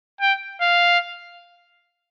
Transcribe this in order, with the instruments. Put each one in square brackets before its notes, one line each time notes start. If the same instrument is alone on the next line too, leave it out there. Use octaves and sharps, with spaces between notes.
[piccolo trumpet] G5
F5